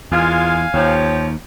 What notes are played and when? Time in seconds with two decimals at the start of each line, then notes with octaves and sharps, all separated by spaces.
0.12 E2 G#3 A#3 F4 F5 G#5
0.74 D#2 F3 G4 C#5